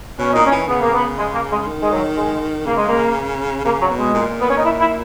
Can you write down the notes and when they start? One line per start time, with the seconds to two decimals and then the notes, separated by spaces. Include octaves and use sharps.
0.19 B2 C#4
0.33 A#2 D#4
0.45 C#4
0.52 E3
0.68 C#3 B3
0.81 A#3
0.93 B3
1.18 G#3
1.33 A#3
1.51 G#3
1.67 D#3
1.81 G#3
1.91 F#3
2.16 G#3
2.66 C#3 A#3
2.77 G#3
2.87 A#3
3.65 C#3 A#3
3.81 F#3
3.90 B2
3.97 G#3
4.14 A#2
4.40 B3
4.48 C#4
4.56 D#4
4.64 E4
4.79 E4